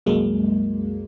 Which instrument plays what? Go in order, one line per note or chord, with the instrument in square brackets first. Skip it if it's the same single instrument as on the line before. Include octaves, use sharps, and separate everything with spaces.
[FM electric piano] C2 F#2 F#3 G#3 A#3